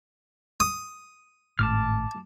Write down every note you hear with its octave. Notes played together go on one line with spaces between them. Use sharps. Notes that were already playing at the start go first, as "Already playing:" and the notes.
D#6
G#1 A2 A5 D6 F6